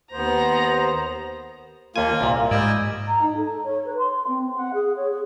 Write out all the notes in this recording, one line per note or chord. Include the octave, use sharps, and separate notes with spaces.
D#2 B3 C5 A#5
D#2 A#3 F4 G#5
C2 A#2
G#2 G3 D5 D#5 G#5 E6
A#5
D#4
A4
C#5
B4
C6
C4
F#5
G#4
C#5
G#4